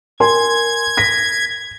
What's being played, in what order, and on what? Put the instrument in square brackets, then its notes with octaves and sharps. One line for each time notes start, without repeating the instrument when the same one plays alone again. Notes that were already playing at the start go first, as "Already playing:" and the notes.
[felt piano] A#4 G#5 C6 [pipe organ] G#6
[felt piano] A#6 B6